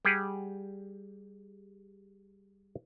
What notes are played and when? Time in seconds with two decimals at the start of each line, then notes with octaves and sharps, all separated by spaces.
0.05 G3 G4 G#4 F#5